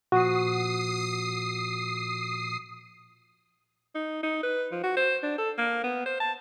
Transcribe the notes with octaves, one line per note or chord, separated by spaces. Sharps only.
A#2 F3 F#4 D#6 C7
D#4
D#4
B4
F3
F#4
C5
D4
A4
A#3
B3
C5
A5